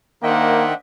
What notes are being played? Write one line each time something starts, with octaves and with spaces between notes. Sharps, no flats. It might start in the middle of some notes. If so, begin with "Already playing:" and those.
D#3 A#3 D4 C5 D#5 E5 F#5 G5